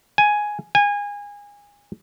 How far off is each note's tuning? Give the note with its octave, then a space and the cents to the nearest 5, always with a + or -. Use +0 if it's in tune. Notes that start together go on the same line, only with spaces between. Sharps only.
G#5 +5
G#5 -25